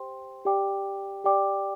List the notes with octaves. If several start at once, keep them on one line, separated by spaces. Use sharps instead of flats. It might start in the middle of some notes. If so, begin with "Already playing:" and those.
Already playing: G4 C5 G5 C6
G4 D5 G5 D6
G4 D5 G5 D6